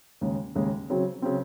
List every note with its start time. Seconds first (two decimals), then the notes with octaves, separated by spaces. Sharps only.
0.21 D#2 C#3 G#3
0.55 D#2 C#3 G#3
0.90 C#3 F#3 C4
1.22 C#3 F#3 C4